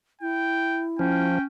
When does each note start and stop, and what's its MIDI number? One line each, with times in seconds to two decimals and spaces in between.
0.22 1.27 64
0.22 0.85 79
0.99 1.39 53
0.99 1.46 61
0.99 1.44 79